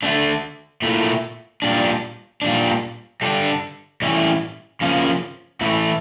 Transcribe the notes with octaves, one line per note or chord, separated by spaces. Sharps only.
D3 A3 D4
A#2 A3 E4
A#2 G3 D4
A#2 G3 D4
D3 G3 D4
A2 E3 G3 C#4 E4
C#3 F3 A#3 C#4
A2 E3 A3 E4